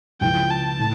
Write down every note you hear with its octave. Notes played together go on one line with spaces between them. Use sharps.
C#2 C#3 F3 C#4 E4 G5
A5
A2